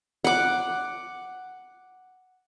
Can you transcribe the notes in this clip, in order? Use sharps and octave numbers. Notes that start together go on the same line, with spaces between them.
F#5 D6